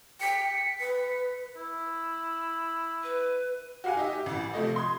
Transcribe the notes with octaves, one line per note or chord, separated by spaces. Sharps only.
G5 B6 C#7
B4
E4
B4
F#4 G4 F5 F#5 G#5
D#4 G4 D#5 E5
G4
A1 E3
C3 F3 A3 D#5
C6 D#6 G#6